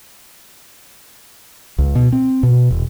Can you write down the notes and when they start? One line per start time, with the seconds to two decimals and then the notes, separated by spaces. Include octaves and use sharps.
1.78 C#2
1.95 B2
2.13 C4
2.43 B2
2.70 E1